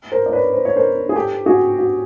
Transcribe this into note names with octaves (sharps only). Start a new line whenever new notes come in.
A#4 C5
D5
B4 C#5
C5
C#5
A#4 C5
G#4
G4 A4
F#4 G#4
F#4